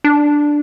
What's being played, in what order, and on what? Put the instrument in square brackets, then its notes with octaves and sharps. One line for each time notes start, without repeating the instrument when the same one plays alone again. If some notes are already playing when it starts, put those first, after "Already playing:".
[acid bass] D4